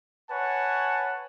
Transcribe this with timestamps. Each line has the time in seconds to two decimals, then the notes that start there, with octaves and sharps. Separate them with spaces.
0.29 B4 C#5 F#5 G#5 A5